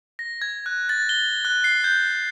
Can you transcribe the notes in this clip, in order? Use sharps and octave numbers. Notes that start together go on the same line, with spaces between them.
A#6
G#6
F#6
A6
G7
F#6
C7
G6